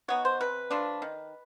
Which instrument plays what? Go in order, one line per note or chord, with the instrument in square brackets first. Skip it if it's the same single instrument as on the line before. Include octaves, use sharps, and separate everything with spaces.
[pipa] B3 D#4 F#4 [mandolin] C#5
[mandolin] C5
[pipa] C3 [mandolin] B4
[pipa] F3 A3 D4
D#3